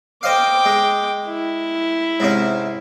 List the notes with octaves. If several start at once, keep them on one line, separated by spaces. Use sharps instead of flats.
C5 D#5 F5 G5 D6
G#3
E4
G#2 C3 C#4